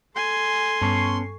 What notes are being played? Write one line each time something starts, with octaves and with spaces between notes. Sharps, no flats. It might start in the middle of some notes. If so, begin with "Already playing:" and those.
A4 G#5 C6
G2 B3 C#4 A5 C#6 C7